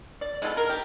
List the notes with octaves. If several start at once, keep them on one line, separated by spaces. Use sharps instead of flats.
D5
G#3 B3 F4 A4
A#4
G4